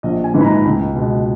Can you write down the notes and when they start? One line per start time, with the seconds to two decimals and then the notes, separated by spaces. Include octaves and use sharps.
0.03 A#1 D#5
0.24 G#5
0.34 G#2 E3 G#3
0.41 B5
0.44 A#5
0.65 C#2
0.95 B2 G#3